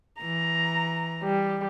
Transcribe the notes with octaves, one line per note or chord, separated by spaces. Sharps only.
E3 A#5
G3